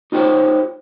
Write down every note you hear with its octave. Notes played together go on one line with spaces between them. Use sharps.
D#4 F4 G4 C5 C#5